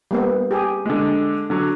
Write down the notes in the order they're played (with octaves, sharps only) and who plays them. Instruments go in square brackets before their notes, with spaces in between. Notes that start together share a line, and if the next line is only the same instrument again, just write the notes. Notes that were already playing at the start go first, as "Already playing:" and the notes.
[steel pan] G3 A#3 B3
G4 G#4
[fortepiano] D3 G#3
D3 F#3